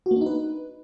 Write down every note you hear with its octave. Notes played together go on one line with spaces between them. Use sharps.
F#4
A#3
D4
D#4
B4